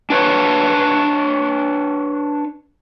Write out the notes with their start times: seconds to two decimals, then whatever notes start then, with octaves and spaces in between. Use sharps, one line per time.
0.10 D4 B4 C#5